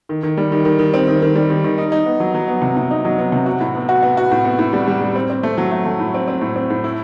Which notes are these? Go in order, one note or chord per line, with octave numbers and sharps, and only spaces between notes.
D#3
D#3
G3
D#3
D#3
D#3
C4
D#3
D#3
G3
D#3
D#3
D#4
D#4
B3
F#3
F#3
B3
C3
C3
D#4
F#3
B3
C3
F#4
A2
B3
F#4
B3
F#4
A2
B3
A2
G3
G3
G3
C4
C4
A3
F#3
A3
A3
A2
C4
C4
A2
C4
A2
E4